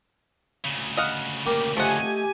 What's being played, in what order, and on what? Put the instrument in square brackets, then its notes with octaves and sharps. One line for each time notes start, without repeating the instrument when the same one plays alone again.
[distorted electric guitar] D2 C#3
[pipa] D#5 F5 F#5
[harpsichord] A#3 G4 A#4
[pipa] F3 F#5 [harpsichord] A3 D#5 [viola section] G4 G#5